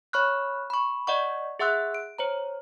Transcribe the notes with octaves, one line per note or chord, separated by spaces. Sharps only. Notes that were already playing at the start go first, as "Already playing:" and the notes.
C#5 B5 C#6 F6 F#6
B5 C#6
D5 D#5 F#5 C#6
G#4 E5 F#5 C6 E6 F#6
D7
C5 C#5 A#5